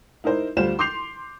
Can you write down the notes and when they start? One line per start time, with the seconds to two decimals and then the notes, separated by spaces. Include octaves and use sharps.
0.24 D#4 E4 A#4 C5
0.57 D2 G3 F4 C5 E7
0.79 C6 D6 G6 C7 F7